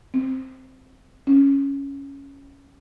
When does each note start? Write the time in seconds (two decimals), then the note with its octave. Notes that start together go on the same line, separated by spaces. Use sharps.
0.14 C4
1.27 C#4